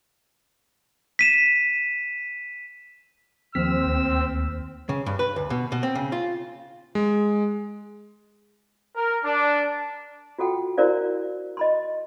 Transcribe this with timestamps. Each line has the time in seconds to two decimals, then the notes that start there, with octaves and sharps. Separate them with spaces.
1.19 B6 D#7 E7
3.55 D#2 F3 C4 E6 F6 B6
3.86 D2
4.89 C#3
5.06 G2
5.19 B4
5.36 D2
5.50 B2
5.72 B2
5.83 C4
5.95 C#3
6.12 F4
6.95 G#3
8.95 A#4
9.24 D4
10.39 F4 F#4 A4 F#5 G5
10.78 E4 F#4 A#4 C5 D5 F5
11.57 D#5 B5 C6